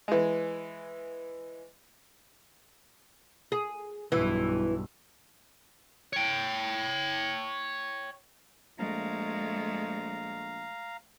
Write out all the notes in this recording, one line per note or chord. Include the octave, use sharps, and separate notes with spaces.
E3 G#3
G#4
B1 G2 E3
C#5 G5
A#1 G#3 A3 F5 A#5